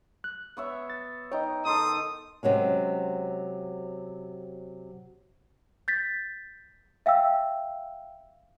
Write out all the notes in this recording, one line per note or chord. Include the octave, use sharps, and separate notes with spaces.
F#6
B3 C#5 E5
A6
D#4 C#5 D#5 G5
D#3 A4 D#5 C6 D#6
C3 F#3 G#3 C#4
G6 A6 B6
E5 F5 G5 E6